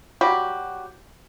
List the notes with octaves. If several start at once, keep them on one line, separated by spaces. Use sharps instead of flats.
F#3 G3 F#4 G4